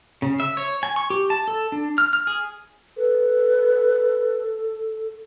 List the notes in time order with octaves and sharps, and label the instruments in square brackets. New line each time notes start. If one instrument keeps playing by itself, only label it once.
[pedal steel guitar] C#3
E5
C#5
G#5
C#6
G4
A5
A4
D4
F6
F6
G#4
[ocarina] A4 [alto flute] B4